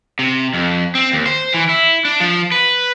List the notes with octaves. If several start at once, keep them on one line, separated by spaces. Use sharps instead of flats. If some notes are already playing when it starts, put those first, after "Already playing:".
C3
F2
C4
D#2
C5
E3
E4
D4
F3
B4